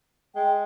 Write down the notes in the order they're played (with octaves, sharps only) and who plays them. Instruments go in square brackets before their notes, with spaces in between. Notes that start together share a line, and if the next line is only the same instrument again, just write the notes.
[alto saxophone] G#3 [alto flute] G5